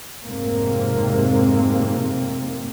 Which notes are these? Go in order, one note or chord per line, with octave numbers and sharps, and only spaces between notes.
F1 F2 G#2 C3 A#3 C4